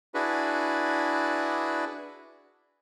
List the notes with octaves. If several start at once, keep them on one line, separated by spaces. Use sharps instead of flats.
D4 E4 F#4 G#4 B4